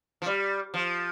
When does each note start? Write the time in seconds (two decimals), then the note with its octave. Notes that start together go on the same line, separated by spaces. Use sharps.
0.22 F3
0.26 G3
0.74 F3